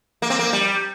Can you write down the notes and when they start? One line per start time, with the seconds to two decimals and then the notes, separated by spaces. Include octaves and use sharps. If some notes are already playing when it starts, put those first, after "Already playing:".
0.22 A#3
0.30 C4
0.39 A#3
0.53 G3